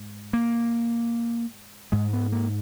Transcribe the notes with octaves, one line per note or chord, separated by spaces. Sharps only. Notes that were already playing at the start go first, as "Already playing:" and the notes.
Already playing: G#2
A#3
G#2 G#3
B3
A#3